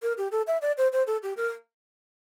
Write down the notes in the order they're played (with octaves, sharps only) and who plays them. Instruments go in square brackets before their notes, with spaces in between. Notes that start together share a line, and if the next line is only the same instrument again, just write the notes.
[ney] A#4
G4
A4
E5
D5
C5
C5
A4
G4
A#4